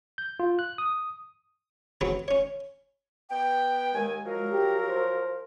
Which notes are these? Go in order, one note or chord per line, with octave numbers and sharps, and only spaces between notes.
G6
F4
F#6
D#6
F#3 C4 C#4 G#4 B4
C#4 C#5
B3 G5
D#2 G#3 G#5
F3 F#3 A#4
G4
C5